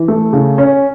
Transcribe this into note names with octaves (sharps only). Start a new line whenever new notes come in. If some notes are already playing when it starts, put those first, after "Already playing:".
Already playing: E3
A3
C#3
C#4